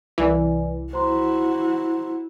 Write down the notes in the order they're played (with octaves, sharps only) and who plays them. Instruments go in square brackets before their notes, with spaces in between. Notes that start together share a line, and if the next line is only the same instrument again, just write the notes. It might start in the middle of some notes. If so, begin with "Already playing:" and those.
[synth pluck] C2 E3 [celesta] B4 D5 G#5
[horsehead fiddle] E4 F#4 [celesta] C5 A#5 C6